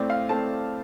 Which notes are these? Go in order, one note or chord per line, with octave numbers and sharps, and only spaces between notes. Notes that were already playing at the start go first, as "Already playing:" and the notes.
Already playing: A2 A3 C4 D5
F5
A2 A3 C4 A5